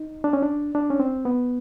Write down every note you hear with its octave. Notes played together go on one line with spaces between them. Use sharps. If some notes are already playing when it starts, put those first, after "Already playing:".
Already playing: D#4
D4
C#4
D4
D4
C#4
C4
B3